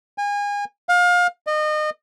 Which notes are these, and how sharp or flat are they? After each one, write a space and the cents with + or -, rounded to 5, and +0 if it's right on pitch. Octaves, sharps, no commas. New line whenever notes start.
G#5 -30
F5 +30
D#5 -30